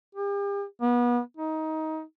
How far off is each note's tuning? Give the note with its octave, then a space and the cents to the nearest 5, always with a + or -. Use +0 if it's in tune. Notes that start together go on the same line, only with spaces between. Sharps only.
G4 +40
B3 -30
D#4 +20